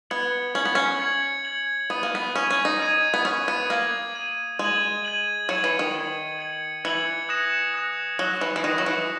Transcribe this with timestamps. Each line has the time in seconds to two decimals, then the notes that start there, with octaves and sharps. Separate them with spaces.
0.10 B3 G#6 C#7 F#7
0.55 C#4 G#6 C#7 F#7
0.65 B3
0.75 C#4
1.00 G#6 C#7 F#7
1.45 G#6 C#7 F#7
1.90 B3 D#6 G#6 D#7
2.03 A#3
2.15 B3
2.35 C#4 D#6 G#6 D#7
2.50 C#4
2.65 D#4
2.80 D#6 G#6 D#7
3.14 B3
3.24 C#4 D#6 G#6 D#7
3.48 B3
3.69 A#3 G#6 D#7 F#7
4.15 G#6 D#7 F#7
4.59 G#3 G#6 D#7 F#7
5.05 G#6 D#7 F#7
5.49 F#3 G#6 C#7 F#7
5.64 E3
5.79 D#3
5.94 G#6 C#7 F#7
6.39 G#6 C#7 F#7
6.85 E3 G#6 C#7 F#7
7.29 D#6 F#6 A#6 C#7 E7
7.74 D#6 F#6 A#6 C#7 E7
8.18 F#3 D#6 F#6 A#6 C#7 E7
8.41 E3
8.56 E3
8.64 D#3 D#6 F#6 A#6 C#7 E7
8.78 F#3
8.86 E3